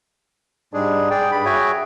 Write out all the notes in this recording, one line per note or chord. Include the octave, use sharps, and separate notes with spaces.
G#2 G3 G#3 D4 G#4
G#4 D5 G5
G2 B5
F#4 G#4 C#5 E5 G5 G#5